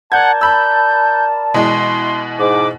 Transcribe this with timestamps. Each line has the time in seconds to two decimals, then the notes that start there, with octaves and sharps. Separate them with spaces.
0.12 A#4 D5 F#5 A5 G6 G#6
0.41 B5 E6 G6
1.54 B2 E3 G#3 C6
2.39 G#2 D6